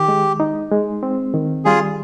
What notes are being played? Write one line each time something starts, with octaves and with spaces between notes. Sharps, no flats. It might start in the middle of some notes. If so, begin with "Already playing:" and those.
Already playing: D#3 G4
G#3
D#4
G#3
C4
D#3
G3 F4 G#4